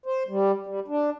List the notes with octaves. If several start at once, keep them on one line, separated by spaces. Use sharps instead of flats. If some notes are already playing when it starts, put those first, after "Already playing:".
C5
G3
G3
D4